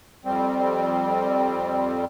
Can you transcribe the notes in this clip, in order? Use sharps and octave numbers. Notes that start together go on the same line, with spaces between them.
F2 G3 C4